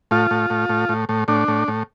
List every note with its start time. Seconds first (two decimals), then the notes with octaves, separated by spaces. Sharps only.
0.11 A2 F4
0.31 A2
0.50 A2
0.69 A2
0.89 A2
1.09 A2
1.28 A2 D4
1.48 A2
1.68 A2